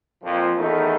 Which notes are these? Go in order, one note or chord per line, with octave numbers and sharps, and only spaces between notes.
F2 A#2 F3
E2 D#3 A3 D#4